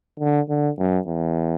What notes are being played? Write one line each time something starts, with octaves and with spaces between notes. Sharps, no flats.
D3
D3
F#2
E2